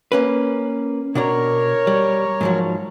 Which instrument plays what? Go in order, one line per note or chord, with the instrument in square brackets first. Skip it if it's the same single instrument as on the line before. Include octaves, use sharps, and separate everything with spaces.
[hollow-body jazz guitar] A#3 C#4 B4
[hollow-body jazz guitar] B2 D4 A#5 [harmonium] A#4 C#5
[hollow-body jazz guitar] G3
G#2 F3 F#3